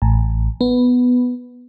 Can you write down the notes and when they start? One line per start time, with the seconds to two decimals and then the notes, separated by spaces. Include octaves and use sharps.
0.02 A1
0.61 B3